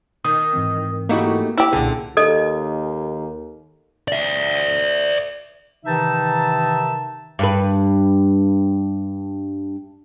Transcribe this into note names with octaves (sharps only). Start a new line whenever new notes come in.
D#3 D#6
G#2 E3 C4
A3 A#3 D#4 E4 F#4 G4
E4 G4 B5
C2 A#2 D3 C#4 G#4 F#5
D#2 A4 D#5
D5 E5
C3 D#3 E3 D#4 E5 A5
G2 B4